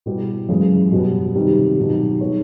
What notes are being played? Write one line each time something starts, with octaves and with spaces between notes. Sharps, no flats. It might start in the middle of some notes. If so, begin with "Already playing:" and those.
B2 G3 B3 E4 G4
F#2 C#3 E3 G#3
B2 G3 B3
C3 D#3 G3
B2 F#3 B3 D#4 G4
G3 B3 D#4 G#4 C#5